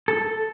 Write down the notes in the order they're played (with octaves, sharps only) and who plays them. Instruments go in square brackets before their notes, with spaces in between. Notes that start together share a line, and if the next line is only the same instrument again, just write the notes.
[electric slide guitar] A4